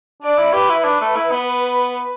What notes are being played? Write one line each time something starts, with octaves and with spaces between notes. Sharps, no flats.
D4 D5
E4
G4 B4
E4
D4 B4
A3
E4
B3